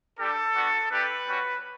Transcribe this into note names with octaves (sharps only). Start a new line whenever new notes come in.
G3 D4 G4 A4
B3 D4 F#4
A3 D4 G4 B4
G3 C#4 F#4